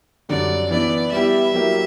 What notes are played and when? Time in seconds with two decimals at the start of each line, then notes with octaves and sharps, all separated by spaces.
0.29 F#2 D3 G3 D5
0.70 E3 B3 D4 D5
1.12 G3 B3 E4 G4 E5
1.54 F#3 A#3 E4 G4